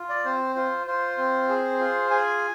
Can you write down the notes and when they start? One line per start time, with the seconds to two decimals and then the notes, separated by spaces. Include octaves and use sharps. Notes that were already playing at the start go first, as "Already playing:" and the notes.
Already playing: F4
0.09 D5
0.25 C4 C5
0.55 F4 C5
0.87 F4 C5
1.18 C4
1.49 G#4
1.80 F4
2.10 G#4 G#5